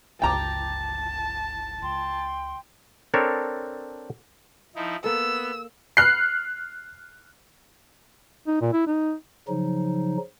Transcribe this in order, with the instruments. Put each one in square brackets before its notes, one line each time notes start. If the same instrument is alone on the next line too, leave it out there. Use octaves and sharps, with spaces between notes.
[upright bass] G1 C#2 [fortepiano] G5 A#5 D6 [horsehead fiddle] A5
[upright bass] C#2 [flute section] G5 C6
[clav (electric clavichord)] C4 D4 A4 A#4 C#5
[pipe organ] F3 D#4 E4
[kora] A#3 A4 [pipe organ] B3 [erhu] E6
[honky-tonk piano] F6 F#6 C7
[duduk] D#4
A#2
E4
D#4
[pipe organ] C#3 F3 F#3 D#4